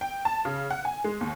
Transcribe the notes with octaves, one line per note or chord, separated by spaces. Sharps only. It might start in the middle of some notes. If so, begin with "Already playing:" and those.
G5
A5
C#3
F#5
G#5
G#3
D#2